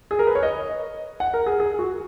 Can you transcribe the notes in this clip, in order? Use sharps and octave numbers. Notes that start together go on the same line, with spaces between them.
G#4
A#4
B4
C#5
D#5
F#5
A#4
G#4
G#4
F#4